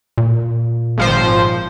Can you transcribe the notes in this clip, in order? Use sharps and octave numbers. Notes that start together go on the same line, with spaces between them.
A#2
G#1 F3 C5